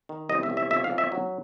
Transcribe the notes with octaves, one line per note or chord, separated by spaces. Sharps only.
D#3
C2 D#5
E5
C2
E5
F2 E5
F5
F2
E5
F#3